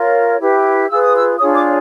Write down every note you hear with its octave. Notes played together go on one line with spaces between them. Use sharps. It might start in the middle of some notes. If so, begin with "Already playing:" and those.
Already playing: F4 A#4 C#5
E4 G4 B4
F4 G#4 B4 E6
D#6
E6
D4 F4 G#4 C#5 D#6
D6